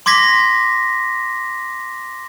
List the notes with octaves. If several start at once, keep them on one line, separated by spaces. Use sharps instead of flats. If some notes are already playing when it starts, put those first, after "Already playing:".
C6 D6 G#6 A#6 B6